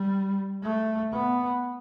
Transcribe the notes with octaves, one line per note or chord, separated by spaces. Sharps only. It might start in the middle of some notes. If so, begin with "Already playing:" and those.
Already playing: G3
A3
B3